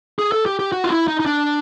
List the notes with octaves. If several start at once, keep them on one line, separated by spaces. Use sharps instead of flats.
G#4
A4
G4
G4
F#4
F4
E4
D#4
D#4
D4